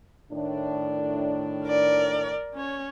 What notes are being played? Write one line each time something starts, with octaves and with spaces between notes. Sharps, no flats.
A2 D#3 D4
A#4 D5
C#4 C#5